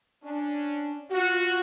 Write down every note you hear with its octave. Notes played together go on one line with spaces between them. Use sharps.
C#4 D4
F4 F#4